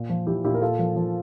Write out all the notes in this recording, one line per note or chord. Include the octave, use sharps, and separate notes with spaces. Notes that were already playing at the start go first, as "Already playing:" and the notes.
Already playing: A#2
F3
F3 E4 G4
A#2 E4 G4
A#4
A#2 F4 A4
F3
F3